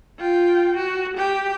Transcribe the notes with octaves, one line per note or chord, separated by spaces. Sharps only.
F4 G5
F#4
G4 G5